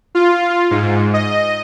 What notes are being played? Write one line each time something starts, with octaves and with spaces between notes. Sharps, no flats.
F4
G#2
D#5